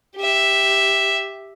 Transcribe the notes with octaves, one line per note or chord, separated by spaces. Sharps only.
G4 E5